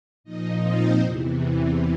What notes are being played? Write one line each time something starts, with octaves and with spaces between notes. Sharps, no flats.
A#2 F3 D#4 D#5
C4 C5
E2 C3 E3